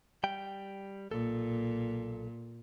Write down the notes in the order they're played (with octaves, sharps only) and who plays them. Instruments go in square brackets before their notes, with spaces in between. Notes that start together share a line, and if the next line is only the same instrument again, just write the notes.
[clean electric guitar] G3 G5
[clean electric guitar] B1 A4 [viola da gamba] A#2